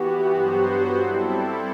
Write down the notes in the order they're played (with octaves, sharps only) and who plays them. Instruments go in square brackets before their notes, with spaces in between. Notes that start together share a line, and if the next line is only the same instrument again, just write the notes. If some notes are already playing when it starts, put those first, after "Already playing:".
Already playing: [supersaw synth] E3 B3 F#4 [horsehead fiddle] G4
[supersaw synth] G2 F#3 B3 F#4 C5
G3 C4 E4 A4